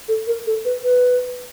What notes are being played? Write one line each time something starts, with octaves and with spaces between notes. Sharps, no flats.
A4
A#4
A4
B4
B4